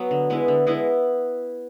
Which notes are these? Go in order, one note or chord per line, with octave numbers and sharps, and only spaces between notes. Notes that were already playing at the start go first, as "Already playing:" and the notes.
Already playing: F#3 B3
D3
G#3 B3 E4
D3
G#3 B3 E4